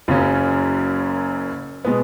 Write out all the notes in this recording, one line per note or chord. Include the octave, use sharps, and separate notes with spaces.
F#1 F#2 C#3 F#3 C#4
B2 G#3 B3